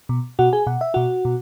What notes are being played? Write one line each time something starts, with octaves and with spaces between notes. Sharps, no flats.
B2
B2 F#4 F#5
G#4 G#5
B2 F#5
E5
B2 F#4 F#5
B2